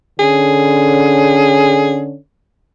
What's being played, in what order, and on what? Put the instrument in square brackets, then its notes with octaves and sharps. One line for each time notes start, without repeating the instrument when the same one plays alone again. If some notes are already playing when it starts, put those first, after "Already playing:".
[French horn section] D3 C#4 [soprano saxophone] G#4